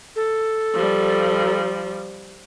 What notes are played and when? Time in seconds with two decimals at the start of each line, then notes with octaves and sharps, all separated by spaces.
0.16 A4
0.74 F3 G3